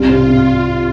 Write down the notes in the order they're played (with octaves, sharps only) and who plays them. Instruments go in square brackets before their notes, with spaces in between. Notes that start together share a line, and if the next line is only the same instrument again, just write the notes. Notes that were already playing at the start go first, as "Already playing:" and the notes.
Already playing: [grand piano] C2 [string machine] F4
[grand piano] C3
C3